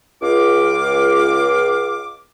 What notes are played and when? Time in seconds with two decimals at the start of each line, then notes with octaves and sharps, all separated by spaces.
0.22 C#2 F5 D6